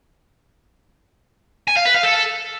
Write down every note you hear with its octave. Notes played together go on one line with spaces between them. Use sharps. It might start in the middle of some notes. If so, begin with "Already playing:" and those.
G#5
F5
B4
F5
A4